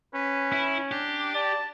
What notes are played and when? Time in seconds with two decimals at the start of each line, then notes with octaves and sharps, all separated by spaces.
0.14 C#4 B4
0.53 E4
0.92 D4 G4
1.35 D5 A5